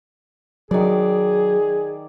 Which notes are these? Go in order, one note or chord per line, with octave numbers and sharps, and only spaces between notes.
D#3 F#3 G#4 D5